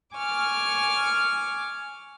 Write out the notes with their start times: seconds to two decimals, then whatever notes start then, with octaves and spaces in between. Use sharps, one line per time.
0.16 G#5 C#6 D6 F6